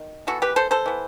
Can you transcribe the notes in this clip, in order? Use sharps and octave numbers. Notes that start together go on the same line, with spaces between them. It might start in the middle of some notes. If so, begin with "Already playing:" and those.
Already playing: D#3
E3 B3 F#4 A4
G4 B4
A4 C5
A4 C5
E3 B3